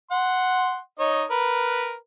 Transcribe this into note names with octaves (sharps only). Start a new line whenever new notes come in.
F#5 C6
D#4 C#5 D#5
A#4 B4